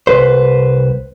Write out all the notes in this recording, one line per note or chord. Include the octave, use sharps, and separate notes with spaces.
C2 B4 C5